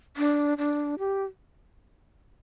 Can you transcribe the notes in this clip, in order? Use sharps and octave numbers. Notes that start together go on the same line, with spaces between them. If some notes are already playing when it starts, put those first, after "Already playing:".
D4
D4
G4